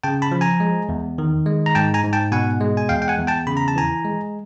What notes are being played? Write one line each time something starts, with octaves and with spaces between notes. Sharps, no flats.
C#3 G5 A5
A5 B5
F3
G#5 A#5
G#3
E2
D#3
G#3
A#5
G#2 G5 A5
G#5 A#5
G#2
G5 A5
B2 F#5 G#5
G#3
G#5
E2 F5 G5
G5
F#5 G#5
E2
G5 A5
C#3 B5
A#5
A5
E3 G#5 A#5
G#3